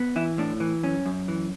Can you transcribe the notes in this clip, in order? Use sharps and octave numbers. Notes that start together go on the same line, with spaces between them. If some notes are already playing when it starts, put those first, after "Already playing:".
Already playing: B3
E3 E4
A2 D4
E3
F#2 C#4
F#2
E3